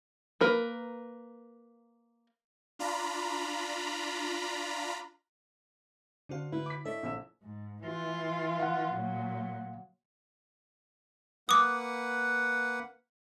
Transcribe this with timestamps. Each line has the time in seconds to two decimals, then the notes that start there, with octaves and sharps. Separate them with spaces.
0.41 A#3 A#4 B4
2.79 D4 F4 A#5 B5
6.29 D3 D4 F#4 C5 F5
6.52 E4 B4
6.66 D6 B6
6.85 D4 A4 C#5 D#5 E5
7.03 A#1 E6 E7
7.43 G#2
7.83 E3 F4
8.60 F5 F#5
8.94 A#2 F#3
11.49 A#3 B4 F#5 D6 D#6